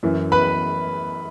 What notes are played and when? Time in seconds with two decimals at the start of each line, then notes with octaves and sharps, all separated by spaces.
0.03 F#2 E3
0.32 B4 B5